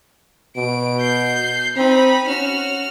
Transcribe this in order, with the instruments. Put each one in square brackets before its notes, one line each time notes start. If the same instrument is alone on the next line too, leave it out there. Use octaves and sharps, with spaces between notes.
[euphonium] B2 [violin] D7
[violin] G6 C7
[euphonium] C4 [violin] D#4 B5
[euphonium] C#4 [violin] F#4 F6